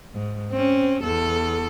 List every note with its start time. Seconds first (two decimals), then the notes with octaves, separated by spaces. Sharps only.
0.13 G#2
0.52 C4 C#4
1.03 E2 A4